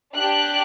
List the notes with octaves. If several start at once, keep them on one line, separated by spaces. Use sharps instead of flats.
D4 G4 F#6